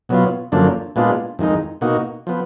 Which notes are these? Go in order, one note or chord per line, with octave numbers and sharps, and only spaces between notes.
B2 F#3 B3 F4
F#2 D3 F3 A#3 D4
A#2 G#3 B3 D4 F4
F2 D#3 G#3 D#4
B2 A#3 D#4 F#4
F3 B3